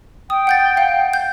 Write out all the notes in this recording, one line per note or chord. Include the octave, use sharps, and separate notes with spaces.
G5 D#6
F#5 G6 A6
F5 F#5
G6